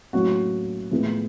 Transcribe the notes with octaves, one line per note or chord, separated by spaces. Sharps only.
A2 F#3 A#3 C#4 F#4
A2 F3 G#3 B3